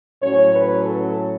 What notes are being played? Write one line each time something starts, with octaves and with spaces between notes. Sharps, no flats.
A2 F#3 C#4 C#5
B4
A4